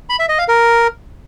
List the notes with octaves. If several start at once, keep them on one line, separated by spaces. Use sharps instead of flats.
B5
E5
D#5
F5
A#4